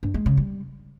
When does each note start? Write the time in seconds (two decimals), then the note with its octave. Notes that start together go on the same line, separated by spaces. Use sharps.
0.03 G2
0.14 G#3
0.26 C#3
0.37 G3